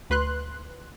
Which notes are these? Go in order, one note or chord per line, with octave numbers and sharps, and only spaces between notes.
D2 B4 C6 F#6